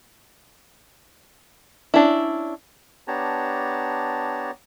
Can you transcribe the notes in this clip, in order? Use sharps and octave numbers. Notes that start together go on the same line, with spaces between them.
C#4 D4 E4
B3 D4 G4 C#5 A5 A#5